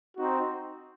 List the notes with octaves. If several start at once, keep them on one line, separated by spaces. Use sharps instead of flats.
C4 D#4 F#4